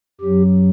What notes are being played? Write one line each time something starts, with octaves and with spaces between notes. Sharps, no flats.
F#2 F#3 G4